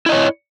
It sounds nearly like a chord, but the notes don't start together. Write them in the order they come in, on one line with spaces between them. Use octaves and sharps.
E4 D#5 C#5